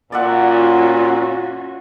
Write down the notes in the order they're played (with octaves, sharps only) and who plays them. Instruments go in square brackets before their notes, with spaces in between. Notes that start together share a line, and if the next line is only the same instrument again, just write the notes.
[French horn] A#2 [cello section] C#4 F4 F#4 [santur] D5 E5 F#5